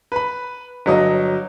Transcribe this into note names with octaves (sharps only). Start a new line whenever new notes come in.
B4 B5
G1 F#3 D#5